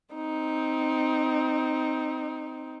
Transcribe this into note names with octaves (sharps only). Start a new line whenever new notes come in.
C4 D#4